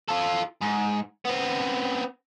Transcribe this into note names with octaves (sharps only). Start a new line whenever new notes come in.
F4 A4
G#2
B3 C4